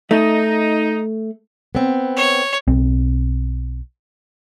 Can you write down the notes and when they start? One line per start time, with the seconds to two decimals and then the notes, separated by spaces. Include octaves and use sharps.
0.11 A3 D#4
1.75 B3 C4
2.17 C#5
2.68 B1 C4